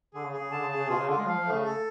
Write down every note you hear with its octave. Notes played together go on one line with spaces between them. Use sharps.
D3 G#4
C#3
G#4
C#3
D3 A5
C#3
G#4
C#3
B2 F4
C#3
D3 F4
G#3
F3 F5
F3
A3
C#3
A4